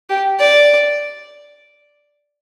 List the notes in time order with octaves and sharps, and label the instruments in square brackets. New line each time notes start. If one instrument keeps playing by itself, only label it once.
[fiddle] G4
D5